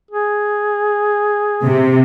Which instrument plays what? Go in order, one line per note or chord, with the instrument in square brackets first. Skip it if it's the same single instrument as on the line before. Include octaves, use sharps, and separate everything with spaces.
[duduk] G#4
[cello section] C3